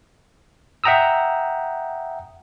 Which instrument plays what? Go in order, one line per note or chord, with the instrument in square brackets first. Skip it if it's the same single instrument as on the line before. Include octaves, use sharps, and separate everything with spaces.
[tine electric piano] E5 F#5 G5 A#5 D#6 E6